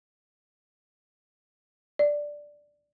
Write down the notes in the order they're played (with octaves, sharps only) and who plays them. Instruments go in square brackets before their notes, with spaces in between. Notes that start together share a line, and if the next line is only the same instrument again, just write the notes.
[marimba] D5